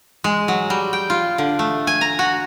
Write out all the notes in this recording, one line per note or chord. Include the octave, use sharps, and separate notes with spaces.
G#3
F#3
G3
G5
F4
D3
A3
G#5
A#5
F#4